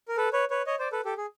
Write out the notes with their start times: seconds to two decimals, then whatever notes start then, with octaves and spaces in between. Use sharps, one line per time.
0.08 A#4
0.17 A4 B4
0.33 B4 C#5
0.50 B4 C#5
0.67 C#5 D#5
0.79 C5 D5
0.92 A4 B4
1.05 G4 A4
1.18 G#4